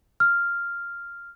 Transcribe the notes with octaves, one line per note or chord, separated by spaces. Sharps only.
F6